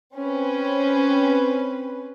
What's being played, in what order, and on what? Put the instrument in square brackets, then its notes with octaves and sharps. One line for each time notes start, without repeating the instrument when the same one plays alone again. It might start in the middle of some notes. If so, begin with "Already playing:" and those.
[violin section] C4 C#4 B4